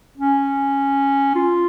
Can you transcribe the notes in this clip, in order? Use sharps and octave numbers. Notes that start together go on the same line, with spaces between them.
C#4
F4